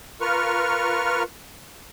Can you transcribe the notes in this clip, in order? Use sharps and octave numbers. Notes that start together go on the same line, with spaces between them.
F4 A#4 B4 C#6 F6